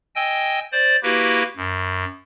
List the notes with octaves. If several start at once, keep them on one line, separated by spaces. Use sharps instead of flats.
D#5 G5 G#5 E6
C5 D5 A6
A#3 E4 F#4 G4 B4
F#2